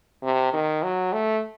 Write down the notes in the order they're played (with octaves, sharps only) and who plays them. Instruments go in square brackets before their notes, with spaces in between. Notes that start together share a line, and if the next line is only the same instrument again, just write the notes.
[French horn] C3
D#3
F#3
A3